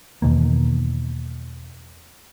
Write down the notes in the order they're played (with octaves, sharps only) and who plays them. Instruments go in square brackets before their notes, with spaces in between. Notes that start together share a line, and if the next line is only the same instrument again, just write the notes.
[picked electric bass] E2 B2 D#3 A#3